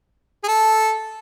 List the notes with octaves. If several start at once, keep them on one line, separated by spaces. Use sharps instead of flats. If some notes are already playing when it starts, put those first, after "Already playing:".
G#4
A4